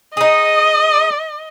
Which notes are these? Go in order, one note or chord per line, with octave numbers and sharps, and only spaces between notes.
D#4 G#4 D#5 D#6